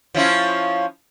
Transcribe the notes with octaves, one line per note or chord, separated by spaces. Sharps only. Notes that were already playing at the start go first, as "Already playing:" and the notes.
F3 C#4 E4